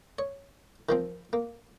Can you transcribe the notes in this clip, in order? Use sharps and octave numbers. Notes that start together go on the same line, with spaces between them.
C#5
D#3 F3 C4
A#3